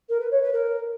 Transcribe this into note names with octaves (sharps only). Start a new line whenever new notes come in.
A#4
B4
C#5
B4
A#4